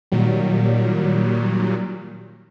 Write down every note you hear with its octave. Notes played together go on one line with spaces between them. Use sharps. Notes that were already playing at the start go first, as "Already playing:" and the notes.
A#2 D#3 F#3 G3